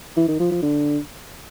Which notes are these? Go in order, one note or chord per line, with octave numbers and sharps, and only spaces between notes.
E3
D#3
F3
F3
D3